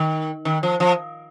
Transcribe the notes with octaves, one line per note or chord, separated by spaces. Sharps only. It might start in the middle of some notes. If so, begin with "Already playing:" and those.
Already playing: D#3
D#3
F3
F3